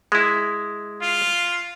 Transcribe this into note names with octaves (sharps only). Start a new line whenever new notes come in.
G#3 E4
F4